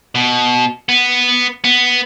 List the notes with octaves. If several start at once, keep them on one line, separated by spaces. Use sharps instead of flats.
B2
B3
B3